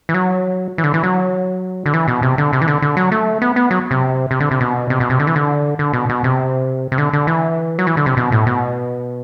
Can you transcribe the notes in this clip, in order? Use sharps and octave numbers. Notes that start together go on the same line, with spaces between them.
E3
F#3
E3
D3
E3
F#3
D3
E3
B2
C3
D3
C3
E3
D3
D3
F#3
A3
B3
B3
F#3
C3
C3
D3
C3
B2
C3
B2
C3
D3
E3
D3
D3
B2
B2
C3
C3
D3
D3
E3
F#3
E3
D3
C3
B2
A2
B2